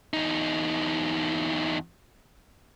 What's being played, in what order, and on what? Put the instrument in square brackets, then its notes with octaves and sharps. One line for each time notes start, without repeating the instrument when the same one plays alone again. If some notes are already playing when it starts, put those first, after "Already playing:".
[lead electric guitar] E2 D#4